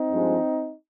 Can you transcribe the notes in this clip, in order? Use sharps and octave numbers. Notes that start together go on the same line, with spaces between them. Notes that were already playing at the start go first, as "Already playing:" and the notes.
Already playing: C4 D#4
G2 F3 G#3